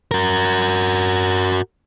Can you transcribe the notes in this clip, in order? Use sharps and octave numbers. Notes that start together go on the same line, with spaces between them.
F#4 A#4